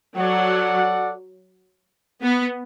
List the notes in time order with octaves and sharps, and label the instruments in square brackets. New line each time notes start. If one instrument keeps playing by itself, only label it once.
[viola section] F#3 [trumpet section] F#4 A4 D5 F#5
[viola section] B3